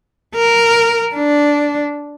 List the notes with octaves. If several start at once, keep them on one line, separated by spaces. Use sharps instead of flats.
A#4
D4